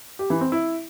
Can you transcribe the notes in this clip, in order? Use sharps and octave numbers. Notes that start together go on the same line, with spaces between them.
G4
E3
C4
E4